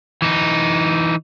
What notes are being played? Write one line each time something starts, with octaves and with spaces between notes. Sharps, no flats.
E3 D#4